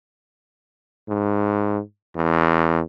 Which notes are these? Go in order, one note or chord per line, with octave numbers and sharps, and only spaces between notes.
G#2
E2